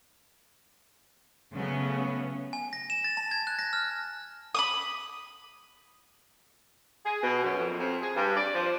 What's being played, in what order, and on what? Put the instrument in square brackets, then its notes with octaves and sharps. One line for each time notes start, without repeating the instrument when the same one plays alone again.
[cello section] C#3 F#3 A3 B3 C#4
[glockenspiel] G#5
A#6
E7
A6
A5
G#6
F#6
A#6
F6
[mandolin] B5 D6 D#6
[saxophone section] G#4
B2
F#2
F2
F2
G#4
G2
D5
F3